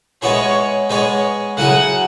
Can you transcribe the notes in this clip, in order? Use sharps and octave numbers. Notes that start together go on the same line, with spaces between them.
G#3 B3 E4 G#4 C#5
G#3 B3 G#4 C#5
C#3 F#3 E4 G#4 F#5